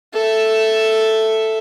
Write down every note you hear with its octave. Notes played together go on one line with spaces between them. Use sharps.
A4 E5